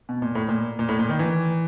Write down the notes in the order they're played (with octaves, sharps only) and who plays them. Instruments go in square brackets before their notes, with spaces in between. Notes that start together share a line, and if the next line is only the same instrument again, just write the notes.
[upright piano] B2
A#2
A2
A#2
A#2
A2
A#2
D#3
E3